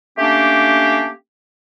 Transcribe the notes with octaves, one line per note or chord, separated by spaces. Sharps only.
A3 A#3 C#4 D4 G4